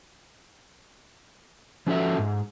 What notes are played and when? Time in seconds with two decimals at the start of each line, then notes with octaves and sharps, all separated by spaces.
1.87 F3 C#4 F4 F#4 A4 E5
2.19 G#2